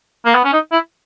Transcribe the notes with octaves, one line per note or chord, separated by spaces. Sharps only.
A#3
B3
C#4
D#4
E4